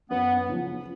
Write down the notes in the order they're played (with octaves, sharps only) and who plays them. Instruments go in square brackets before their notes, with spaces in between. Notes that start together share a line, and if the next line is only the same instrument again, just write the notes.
[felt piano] F#2 [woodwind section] B3
[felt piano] C#3 F3